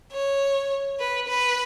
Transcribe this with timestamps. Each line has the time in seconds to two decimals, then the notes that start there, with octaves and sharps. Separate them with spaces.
0.12 C#5
0.99 B4
1.28 B4